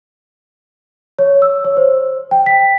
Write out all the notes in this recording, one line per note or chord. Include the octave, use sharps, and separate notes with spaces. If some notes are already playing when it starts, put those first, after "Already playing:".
C#5
E6
C#5
C5
G5
B6